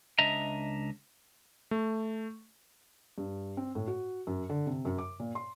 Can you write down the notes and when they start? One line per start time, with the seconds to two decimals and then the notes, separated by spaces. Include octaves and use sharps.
0.19 C#2 D4 D#5 E5 A#5
1.71 A3
3.18 G2
3.57 C4
3.75 A2
3.88 F#4
4.27 F#2
4.50 D3
4.67 C3
4.85 F#2
4.98 D6
5.20 A#2
5.35 C6